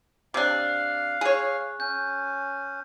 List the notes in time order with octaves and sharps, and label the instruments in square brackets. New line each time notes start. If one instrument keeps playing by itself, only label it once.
[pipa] C3 D4 [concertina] F5 [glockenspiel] D6 F#6
[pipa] G#4 C#5
[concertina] C#4 [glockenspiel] G6